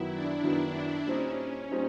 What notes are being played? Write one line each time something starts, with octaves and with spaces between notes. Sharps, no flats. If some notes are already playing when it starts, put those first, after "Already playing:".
Already playing: F#2 D#3 F#3 B3 E4
D4
F#2 D#3 F#3 B3 D4
A#2 G3 C4 C#4 D#4
C#4
A#2 G3 C4 D#4